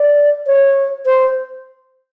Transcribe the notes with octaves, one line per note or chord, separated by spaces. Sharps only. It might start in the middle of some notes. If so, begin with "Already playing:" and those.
Already playing: D5
C#5
C5